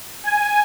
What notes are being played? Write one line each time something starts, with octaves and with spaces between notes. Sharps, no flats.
G#5